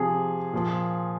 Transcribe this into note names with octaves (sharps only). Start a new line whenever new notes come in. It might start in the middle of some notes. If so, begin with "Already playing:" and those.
Already playing: C3 F3 G#4
A#2 F3